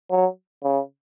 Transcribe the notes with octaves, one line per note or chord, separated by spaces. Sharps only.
F#3
C#3